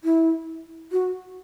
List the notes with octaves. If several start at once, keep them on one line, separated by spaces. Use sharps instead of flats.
E4
F#4